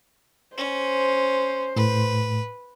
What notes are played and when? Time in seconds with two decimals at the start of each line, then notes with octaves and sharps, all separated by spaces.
0.57 C#4 C5
1.76 A2 B4